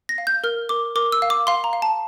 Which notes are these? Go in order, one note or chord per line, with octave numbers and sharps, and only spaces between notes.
A#6
F5
G6
A#4 F6
A#4 D6
A#4 D6
E6
F5
D6
F5 C6
A#5
F5
A5